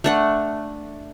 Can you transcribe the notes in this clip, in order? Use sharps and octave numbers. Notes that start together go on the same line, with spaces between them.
A3 D4 F#5